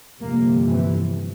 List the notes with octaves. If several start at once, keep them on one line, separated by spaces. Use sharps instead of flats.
G1 F2 C3 A#3
E3